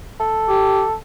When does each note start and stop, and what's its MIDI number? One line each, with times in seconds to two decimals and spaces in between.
0.20 0.94 69
0.49 0.83 67